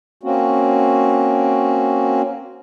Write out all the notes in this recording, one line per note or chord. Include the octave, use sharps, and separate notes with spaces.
A#3 C4 C#4 F#4